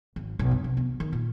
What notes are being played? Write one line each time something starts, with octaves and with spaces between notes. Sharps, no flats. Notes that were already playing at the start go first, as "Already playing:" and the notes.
G#1
B1
G2
C3
B3
D#3
A#2